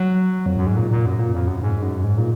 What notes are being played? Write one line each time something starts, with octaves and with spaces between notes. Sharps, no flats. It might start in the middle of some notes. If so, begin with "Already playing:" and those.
Already playing: F#3
F2
F#2
G#2
A#2
A#2
F#2
A#2
F2
F#2
G#2
F#2
G#2
A#2